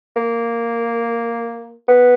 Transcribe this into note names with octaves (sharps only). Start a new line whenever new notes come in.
A#3
B3